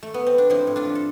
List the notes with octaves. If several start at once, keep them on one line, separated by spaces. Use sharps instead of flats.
A3
B3
C4
D4
F3 C4 E4
A2
D4 F4
F3
A4